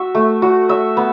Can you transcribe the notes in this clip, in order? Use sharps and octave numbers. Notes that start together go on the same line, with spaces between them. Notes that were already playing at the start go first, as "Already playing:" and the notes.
Already playing: F#4 E5
A3
F#4
E5
B3